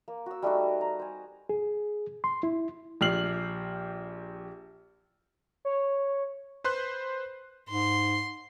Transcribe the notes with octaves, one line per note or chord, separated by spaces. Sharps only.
A#3
F#4 E6
G3 A3 D#4 F#4
A#5
C5 G#5
G#4
C6
E4
A#1 G4 F6 C7 F#7
C#5
B4 C5 C6 F#6
G#2 C6